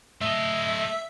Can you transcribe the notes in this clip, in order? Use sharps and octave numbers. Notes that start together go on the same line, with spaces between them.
A3 D#5 E5